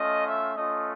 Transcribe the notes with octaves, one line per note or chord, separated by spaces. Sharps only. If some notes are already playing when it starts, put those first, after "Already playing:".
Already playing: A3 C#4 F4 D#5
E5
A3 C#4 F4 D#5